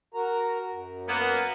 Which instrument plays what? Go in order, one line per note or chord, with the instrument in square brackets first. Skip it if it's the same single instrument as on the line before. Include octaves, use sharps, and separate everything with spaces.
[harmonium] F#4 A#4 A#5
F#2
[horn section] A#3 B3